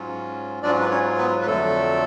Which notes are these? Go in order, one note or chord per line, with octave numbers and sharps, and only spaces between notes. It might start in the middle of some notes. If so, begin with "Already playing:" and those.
Already playing: G#2 F#3 C#4 F4
G#2 F#3 C#4 D4 F4 D5
B4
C#4 C#5
B3 B4
B4
F2 D3 F#3 A3 A4